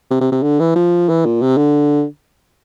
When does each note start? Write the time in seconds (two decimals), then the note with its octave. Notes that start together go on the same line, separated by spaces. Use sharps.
0.11 C3
0.21 C3
0.32 C3
0.43 D3
0.59 E3
0.75 F3
1.09 E3
1.25 A#2
1.41 C3
1.57 D3